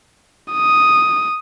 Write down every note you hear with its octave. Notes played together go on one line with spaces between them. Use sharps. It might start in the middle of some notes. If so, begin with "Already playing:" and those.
D#6